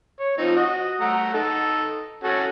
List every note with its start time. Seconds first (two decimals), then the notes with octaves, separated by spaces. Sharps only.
0.19 C#5
0.38 F3 C4 D#4
0.56 F#4 D#5
1.00 A3 F#5 A#5
1.34 D#4 A4
2.24 C#4 F#4 A4